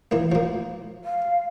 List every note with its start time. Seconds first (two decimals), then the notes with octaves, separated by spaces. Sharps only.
0.11 E3 A#3
0.32 F3 A#3
1.04 F5